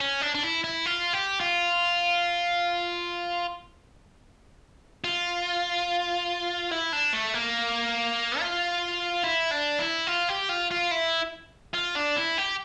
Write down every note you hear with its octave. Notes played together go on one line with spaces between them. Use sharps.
C#4
D4
D4
E4
E4
F4
G4
F4
F4
E4
D4
A3
A#3
F4
E4
D4
E4
F4
G4
F4
F4
E4
F4
D4
E4
G4